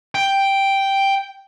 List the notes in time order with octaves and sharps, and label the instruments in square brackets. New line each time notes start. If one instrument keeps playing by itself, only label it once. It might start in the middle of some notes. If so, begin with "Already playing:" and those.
[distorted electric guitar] G5